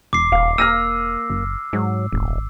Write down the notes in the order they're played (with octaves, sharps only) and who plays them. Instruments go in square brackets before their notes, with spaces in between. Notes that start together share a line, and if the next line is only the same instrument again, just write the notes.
[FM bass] E1 [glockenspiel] D6 C7
[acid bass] D#1 [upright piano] F5
[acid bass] A#3 [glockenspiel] E6 [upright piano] F6 A#6 D#7
[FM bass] F#1
[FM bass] G#2 [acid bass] F#3
[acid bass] D#1 [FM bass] G#1